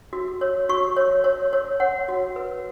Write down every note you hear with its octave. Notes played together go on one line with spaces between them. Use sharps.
F#4
C#5
F#4 C#6
C#5
C#5
C#5
C#5 F#5
F#4
B4